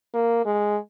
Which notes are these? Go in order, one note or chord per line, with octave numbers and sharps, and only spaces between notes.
A#3
G#3